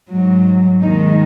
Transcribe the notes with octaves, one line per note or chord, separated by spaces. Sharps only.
G#2 F#3
D#2 D#3 G#3 D#4